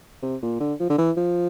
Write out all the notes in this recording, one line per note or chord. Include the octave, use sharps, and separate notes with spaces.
C3
A#2
D3
F3
D3
E3
F3